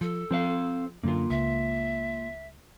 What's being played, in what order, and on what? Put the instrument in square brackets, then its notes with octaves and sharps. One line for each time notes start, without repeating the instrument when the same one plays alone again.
[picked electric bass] F3 [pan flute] A4
[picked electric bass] F3 [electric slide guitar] C4 C5 F5
[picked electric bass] F#2 D3 [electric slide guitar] A#3 F4
[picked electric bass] C#2 [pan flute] E5